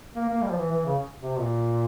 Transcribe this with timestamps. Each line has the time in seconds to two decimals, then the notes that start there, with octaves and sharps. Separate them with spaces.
0.16 A#3
0.30 A#3
0.43 G3
0.51 F3
0.58 E3
0.71 E3
0.86 C#3
1.19 C3
1.40 A#2